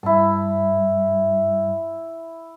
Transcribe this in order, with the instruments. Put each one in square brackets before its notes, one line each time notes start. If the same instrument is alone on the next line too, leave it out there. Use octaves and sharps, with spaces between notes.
[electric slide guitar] G2 [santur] E4 A5